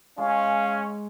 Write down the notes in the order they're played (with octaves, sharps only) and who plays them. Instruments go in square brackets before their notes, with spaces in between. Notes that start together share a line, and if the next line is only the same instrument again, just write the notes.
[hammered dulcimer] G#3 [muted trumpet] C#4 [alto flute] F5